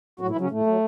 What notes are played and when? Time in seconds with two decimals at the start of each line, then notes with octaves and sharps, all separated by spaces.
0.20 A2 F#3 F#4
0.30 E3 E4
0.36 F#3
0.41 C#3 C#4
0.51 A2 A3
0.67 F#3